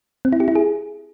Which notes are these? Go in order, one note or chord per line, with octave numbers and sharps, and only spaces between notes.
C4
E4
G4
E4
G#4